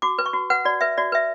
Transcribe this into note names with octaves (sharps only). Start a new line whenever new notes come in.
F#4 D6
B4
C#6
F#4
B4 F#5
F#4 D5
B4 E5
F#4 D5
B4 E5